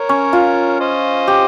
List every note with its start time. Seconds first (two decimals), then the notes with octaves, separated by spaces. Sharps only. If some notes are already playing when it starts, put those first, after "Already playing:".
Already playing: A#4 C#5
0.09 C#4
0.33 F4
0.80 C5 D#5
1.28 G4